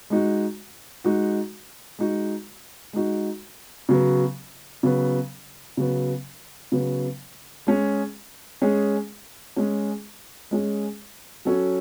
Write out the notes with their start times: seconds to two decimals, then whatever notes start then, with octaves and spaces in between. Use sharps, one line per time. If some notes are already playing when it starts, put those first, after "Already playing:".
0.10 G#3 D#4 F#4
1.05 G#3 D#4 F#4
1.99 G#3 D#4 F#4
2.93 G#3 D#4 F#4
3.89 C#3 F#3 B3
4.83 C#3 F#3 B3
5.77 C#3 F#3 B3
6.72 C#3 F#3 B3
7.67 G#3 C#4 G#4
8.62 G#3 C#4 G#4
9.56 G#3 C#4 G#4
10.51 G#3 C#4 G#4
11.45 F#3 C#4 F#4 A4 C#5